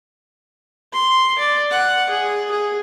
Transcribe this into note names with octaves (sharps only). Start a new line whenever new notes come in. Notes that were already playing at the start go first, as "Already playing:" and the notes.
C6
D5
F#5
G#4
G#4